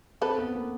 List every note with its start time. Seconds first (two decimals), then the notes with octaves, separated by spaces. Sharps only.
0.21 C4 A4 B4
0.38 B3
0.55 A#3